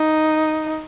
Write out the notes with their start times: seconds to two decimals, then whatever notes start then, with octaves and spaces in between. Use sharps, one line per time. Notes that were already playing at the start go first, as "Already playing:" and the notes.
Already playing: D#4